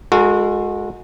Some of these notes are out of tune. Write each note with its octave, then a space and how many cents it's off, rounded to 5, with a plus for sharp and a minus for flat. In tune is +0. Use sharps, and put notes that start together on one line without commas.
G#3 +0 F#4 -25 A4 +40